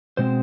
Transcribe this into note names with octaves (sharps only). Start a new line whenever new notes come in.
B2 G#3 C4 C5